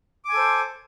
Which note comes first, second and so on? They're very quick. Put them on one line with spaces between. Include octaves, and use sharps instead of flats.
D6 G#5 A4 C5